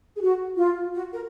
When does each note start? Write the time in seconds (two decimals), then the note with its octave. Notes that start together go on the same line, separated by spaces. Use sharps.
0.16 G#4
0.21 F#4
0.57 F4
0.94 F#4
1.13 A#4